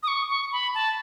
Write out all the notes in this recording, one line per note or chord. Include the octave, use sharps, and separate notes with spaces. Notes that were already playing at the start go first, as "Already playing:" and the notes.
D#6
C#6
C#6
B5
A5